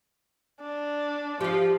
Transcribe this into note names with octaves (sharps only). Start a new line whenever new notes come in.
D4
F3 G4 F5